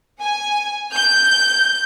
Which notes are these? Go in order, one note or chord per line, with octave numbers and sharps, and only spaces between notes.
G#5
G6